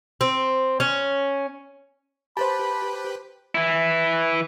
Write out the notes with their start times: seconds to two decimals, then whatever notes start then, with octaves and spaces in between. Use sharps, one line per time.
0.21 C4
0.80 C#4
2.37 G4 B4 C5 A5 B5
3.55 E3 E4